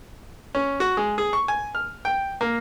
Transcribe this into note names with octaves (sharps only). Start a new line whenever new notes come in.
C#4
F#4
G#3
G#4
C#6
G#5
F6
G5
A#3